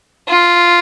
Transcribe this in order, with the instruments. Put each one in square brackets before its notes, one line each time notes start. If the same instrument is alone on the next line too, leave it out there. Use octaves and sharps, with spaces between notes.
[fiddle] F4